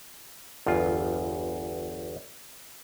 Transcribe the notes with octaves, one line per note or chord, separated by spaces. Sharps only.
G1 E2 F4